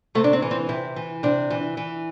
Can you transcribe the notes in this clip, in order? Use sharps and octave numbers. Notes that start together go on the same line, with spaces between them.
C3 A3
D4
C4
E3
C4
C3 E4
E3
C3 D4
E3
E3